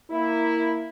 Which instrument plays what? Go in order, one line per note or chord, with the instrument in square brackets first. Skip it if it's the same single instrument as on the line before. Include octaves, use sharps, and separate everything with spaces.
[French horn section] A#3 E4